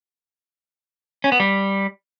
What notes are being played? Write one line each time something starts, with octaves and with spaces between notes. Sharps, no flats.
C#4
B3
G3